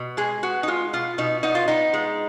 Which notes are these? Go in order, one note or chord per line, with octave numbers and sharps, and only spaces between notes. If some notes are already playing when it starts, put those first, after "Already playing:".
Already playing: B2
G#3 G#4
B3 F#4
D#4
G#3 F4
B2 F4
B2 D#4
B3 D#4
F4
B3 D#4
G#3